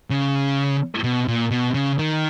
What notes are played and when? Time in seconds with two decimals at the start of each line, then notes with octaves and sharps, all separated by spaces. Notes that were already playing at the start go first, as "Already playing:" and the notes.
0.10 C#3
1.04 B2
1.28 A#2
1.51 B2
1.74 C#3
1.99 D#3